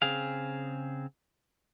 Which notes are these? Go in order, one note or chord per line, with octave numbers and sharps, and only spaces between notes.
C#3 C4 G#4 F5